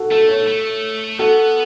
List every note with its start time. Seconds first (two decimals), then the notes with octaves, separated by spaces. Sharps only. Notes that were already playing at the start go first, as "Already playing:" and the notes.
Already playing: F#4 A4
0.11 A3 F#4 A4
0.28 A4 C#5
0.47 A3
1.19 B3 F#4 A4